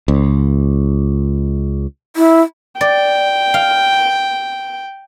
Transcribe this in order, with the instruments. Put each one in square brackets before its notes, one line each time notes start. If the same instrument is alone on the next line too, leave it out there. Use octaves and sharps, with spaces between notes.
[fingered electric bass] C#2
[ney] E4
[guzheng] D5 [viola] G5
[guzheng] F5